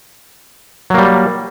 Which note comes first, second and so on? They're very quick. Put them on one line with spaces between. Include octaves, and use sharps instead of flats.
F#3 A#3 G3